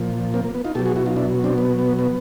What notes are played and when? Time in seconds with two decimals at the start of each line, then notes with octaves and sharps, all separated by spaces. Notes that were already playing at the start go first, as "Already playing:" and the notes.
Already playing: A#2 F3
0.34 A#3 C4
0.44 A#3
0.54 B3
0.65 D#4 F4
0.75 B2 G4 A4
0.79 F#3
0.85 F#4 G#4
0.96 E4 F#4
1.06 D#4 F4
1.16 D4 E4
1.44 C4 D4
1.58 B3
1.79 B3
1.99 B3